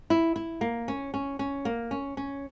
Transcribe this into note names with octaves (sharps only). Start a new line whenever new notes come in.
E4
E4
A#3
C#4
C#4
C#4
A#3
C#4
C#4